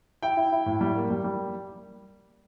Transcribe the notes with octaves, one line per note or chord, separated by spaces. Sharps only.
E4 G5
E4
E4
A2
G3
A#3
G3
G3